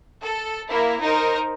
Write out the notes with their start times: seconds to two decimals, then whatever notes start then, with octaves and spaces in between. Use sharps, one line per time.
0.21 A4
0.68 A#3 E4 A#4
1.00 D#4 A#4 C5